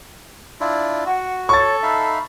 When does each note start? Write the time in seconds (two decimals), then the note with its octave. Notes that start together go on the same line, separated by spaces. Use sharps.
0.60 D4 E4 F4
1.06 F#4 F#5
1.49 A4 C#5 C#6 A6
1.83 D#4 E5 F5 B5